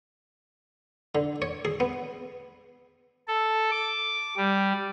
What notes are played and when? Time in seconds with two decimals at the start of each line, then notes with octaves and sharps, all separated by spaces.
1.15 D3
1.42 C#5
1.65 G#4
1.80 B3
3.28 A4
3.71 D6
4.37 G3